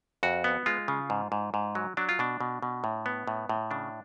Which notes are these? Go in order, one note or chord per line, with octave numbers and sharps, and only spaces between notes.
F2 F#4
B3
G#3 F4
C#3
G#2
G#2
G#2
F#3
F#3 D4
F4
B2 D4
B2
B2
A2
B3
A2
A2
C#3 D4